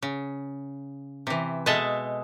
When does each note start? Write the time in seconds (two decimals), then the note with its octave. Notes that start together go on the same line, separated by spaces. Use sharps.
0.02 C#3
1.27 C3 E3
1.66 B2 G#3 A4 D#5 E5 A5